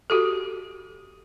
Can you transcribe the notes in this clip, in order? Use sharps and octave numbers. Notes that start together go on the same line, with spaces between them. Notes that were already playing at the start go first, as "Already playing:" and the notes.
F#4 G4 A4